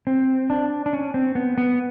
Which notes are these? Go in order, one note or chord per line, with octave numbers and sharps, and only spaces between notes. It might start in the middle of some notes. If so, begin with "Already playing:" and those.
C4
D4
D4
C#4
C4
B3
B3